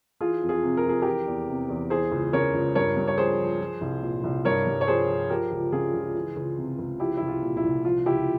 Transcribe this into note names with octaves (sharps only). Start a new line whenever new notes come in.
E3 F4 G#4
F2
F4 G#4
C3
A#4
F2
G#4
E3 G4 A#4
E2
C3
E2
E3 G#4 C5
C#2
C#3 A#4 C#5
C#2
G2 A#4 C#5
G2
C#5
F3 G#4 C5
F3
F3
C2
A#2
C2
G2 A#4 C#5
G2
C#5
F3 G#4 C5
F3
F3 G4 A#4
C#2
C#3 F4 G#4
C#2
E3
C#2
C3
C#2
F3 E4 G4
C2 E4
F4
A#2
E4
C2
F3 F4
C#2 E4 G4